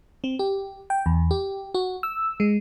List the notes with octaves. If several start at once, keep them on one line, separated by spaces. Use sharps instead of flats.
C4
G4
G5
E2
G4
F#4
E6
G#3